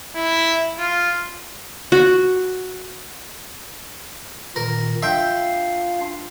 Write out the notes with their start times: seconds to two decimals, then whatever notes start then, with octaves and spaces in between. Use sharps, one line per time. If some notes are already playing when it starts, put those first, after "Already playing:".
0.16 E4
0.79 F4
1.92 F#4
4.56 A#2 D#3 A#4
5.03 D4 F4 E5 F5 G5